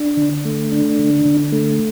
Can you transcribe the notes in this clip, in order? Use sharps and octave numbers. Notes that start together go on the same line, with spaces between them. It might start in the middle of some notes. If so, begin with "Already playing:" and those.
Already playing: D4
D3
A3
D4
D3
D3
A3